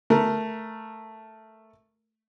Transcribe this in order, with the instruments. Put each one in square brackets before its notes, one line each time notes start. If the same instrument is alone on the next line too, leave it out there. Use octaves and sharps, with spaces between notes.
[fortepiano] A3 A#4